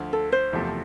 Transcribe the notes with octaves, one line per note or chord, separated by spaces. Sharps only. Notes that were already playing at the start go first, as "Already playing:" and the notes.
Already playing: D2 D3 F3
A4
C5
F#1 E2 C3 F3 A3